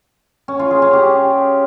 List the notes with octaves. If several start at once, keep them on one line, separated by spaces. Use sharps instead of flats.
C#4
F4
G#4
C#4
G4